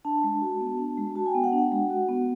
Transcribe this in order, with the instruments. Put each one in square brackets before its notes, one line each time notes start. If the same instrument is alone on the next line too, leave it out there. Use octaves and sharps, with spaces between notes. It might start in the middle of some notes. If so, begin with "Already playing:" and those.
[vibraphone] D4 A5
G#3
F#4
B3
D4
G#3
F#4 A5
G#5
G5
B3
F#5
D4
F#5
G#3
F#4
B3